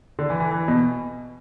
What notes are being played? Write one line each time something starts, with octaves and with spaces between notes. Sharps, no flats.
D3
E3
E3
E3
B2